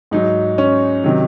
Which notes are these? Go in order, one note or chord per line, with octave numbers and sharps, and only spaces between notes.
G#2 F#3 D#4
C#4
C3 D#3 F#3